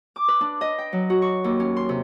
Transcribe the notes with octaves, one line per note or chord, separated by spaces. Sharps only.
D6
B4
D4
D#5
G5
F#3
F#4
C#6
D#2
C#4
C6
C3